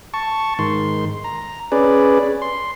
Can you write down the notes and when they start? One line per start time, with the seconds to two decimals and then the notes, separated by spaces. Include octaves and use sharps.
0.14 A5 C#6
0.59 G#2 D#3 C6
1.24 A#5
1.72 C#4 G#4 B4 D5
2.42 C6